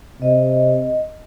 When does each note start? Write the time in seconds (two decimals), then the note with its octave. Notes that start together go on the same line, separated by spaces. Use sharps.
0.22 C3 D#5